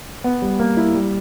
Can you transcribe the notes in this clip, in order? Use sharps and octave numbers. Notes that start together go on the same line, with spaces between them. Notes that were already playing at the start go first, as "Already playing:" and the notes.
B3
G3
A#3
E4
G3